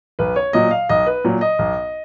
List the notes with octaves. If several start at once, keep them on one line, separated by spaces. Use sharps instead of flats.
B1 B4
C#5
A#2 F#3 D#5
F5
B1 D#5
B4
A#2 F#3
D#5
B1